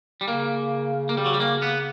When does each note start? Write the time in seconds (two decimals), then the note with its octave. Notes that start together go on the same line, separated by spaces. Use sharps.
0.21 G3
0.27 C#3 A#3
1.09 A#3
1.17 G3
1.26 F#3
1.33 G3
1.40 A#3
1.62 B3